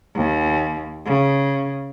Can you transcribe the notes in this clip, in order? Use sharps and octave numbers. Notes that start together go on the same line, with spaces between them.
D#2
C#3